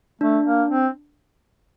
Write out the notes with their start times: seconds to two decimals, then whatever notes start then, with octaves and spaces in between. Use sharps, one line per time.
0.21 A3 D4
0.45 A#3
0.70 C4